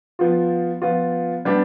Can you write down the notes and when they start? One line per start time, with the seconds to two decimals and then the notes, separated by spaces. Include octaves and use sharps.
0.19 F3 B3 F4
0.82 F3 B3 F4
1.45 G3 B3 D4 G4